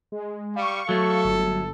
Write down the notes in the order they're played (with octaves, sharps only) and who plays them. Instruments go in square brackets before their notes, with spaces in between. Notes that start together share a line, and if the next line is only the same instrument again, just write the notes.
[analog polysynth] G#3
[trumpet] G3 [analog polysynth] F5 C#6
[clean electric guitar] F#3 A3 [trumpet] A4
[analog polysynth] G1